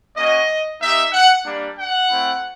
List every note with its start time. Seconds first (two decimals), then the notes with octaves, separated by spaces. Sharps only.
0.16 A#3 C#4 F#4 D#5
0.81 A#3 D#4 G4 E5
1.13 F#5
1.45 G3 A#3 D4
1.78 F#5
2.10 A3 C4 E4